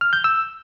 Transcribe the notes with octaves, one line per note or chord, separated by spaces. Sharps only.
F6
G6
E6